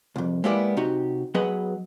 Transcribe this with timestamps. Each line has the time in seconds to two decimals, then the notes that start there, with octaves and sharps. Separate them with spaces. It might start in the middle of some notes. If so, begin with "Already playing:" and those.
0.16 C2 F2
0.44 G#3 A#3 B3 E4 G4 D5
0.77 C3 D#4 F#4 G4
1.35 F#3 B3 G#4 B4 D#5